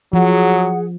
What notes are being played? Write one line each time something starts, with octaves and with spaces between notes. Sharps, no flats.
F3 F#3 G#4 F#5